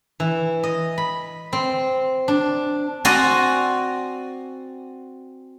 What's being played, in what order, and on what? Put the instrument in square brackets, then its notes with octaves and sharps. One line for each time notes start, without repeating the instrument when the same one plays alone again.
[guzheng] E3
D#5
B5
C4
D4
C4 F#4 D5 G#5 A#5 C6